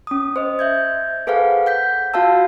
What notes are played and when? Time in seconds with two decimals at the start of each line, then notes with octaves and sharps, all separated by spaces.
0.07 C#4 D#6
0.36 C5 D#5
0.59 E5 G6 G#6
1.27 G#4 A4 B4 C5 F5 F#5
1.66 F#5 G6 B6
2.14 F4 F#4 F5 F#5 A5 E6